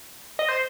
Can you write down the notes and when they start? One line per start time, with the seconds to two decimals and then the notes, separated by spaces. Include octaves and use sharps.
0.39 D#5
0.49 C5